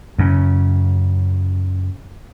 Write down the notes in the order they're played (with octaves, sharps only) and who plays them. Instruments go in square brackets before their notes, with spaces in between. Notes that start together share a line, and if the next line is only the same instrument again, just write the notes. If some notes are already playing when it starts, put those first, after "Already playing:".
[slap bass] F#2 C#3